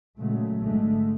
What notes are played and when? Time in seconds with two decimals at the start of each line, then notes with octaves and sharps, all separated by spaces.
0.19 A#2 C#3 F#3 G#3 A3
0.60 G#1 D3 G#3 A3